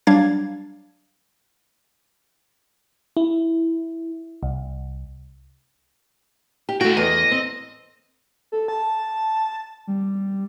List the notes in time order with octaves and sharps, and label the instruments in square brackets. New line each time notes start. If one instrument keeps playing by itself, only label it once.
[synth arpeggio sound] F#3 G3 D4 F5 G#6 A6
[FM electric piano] E4
C2
[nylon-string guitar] G4
[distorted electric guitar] G#3 G5 [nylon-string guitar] A3 F#4
[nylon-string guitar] E2 [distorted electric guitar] D#5
[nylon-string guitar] C4
[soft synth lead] A4
A5
G3